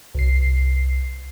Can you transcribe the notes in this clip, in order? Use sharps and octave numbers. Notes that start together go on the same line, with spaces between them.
C2 C7